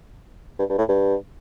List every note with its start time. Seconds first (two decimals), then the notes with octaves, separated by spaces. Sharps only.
0.59 G2
0.69 G2
0.78 A2
0.89 G2